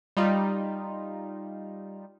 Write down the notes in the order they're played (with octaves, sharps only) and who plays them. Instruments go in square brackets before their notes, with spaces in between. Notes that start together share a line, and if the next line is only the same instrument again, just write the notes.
[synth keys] G3 D#4 F4